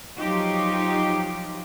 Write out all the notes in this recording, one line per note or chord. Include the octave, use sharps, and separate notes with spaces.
F3 F#3 D#4 F4 G4